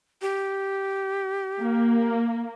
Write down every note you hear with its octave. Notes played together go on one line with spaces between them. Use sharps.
G4
A#3